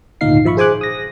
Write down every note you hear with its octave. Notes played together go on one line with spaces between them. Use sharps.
G#1 D2 A#2 D#4 F5 C7
G#1 F3 E5 B5 C#6
G#4 C5 G#5 D6 F#6
D#6 A#6